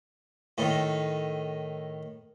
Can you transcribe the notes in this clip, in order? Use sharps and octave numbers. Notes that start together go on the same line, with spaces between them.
A2 D#3